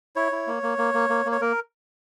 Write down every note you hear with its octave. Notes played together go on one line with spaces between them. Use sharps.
E4 C#5
E4
A#3
A#3
A#3
A#3
A#3
A#3
C#5
A#3 A#4